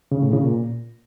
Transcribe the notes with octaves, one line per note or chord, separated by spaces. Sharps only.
C#3
A2
C#3
A#2